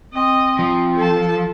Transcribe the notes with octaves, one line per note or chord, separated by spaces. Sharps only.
C4 D#5
F3
A4 A5